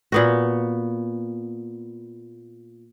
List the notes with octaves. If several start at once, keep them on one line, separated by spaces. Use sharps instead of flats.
A#2 B3 F#4